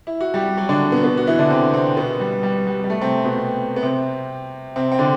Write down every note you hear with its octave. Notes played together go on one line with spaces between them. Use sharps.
E4
F#4
G3 G4
F#3 F#4
D3 D4
B2 B3
B2 B3
F#4
E3 E4
D3 D4
C3 C4
C3 C4
B2 B3
G3
G3
G3
G3
A3
C3 C4
B2 B3
B3
C3 C4
C3 C4
C4
D3 D4